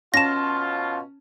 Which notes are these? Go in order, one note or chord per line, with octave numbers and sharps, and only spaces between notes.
B2 C#4 F4 A5 A#6 E7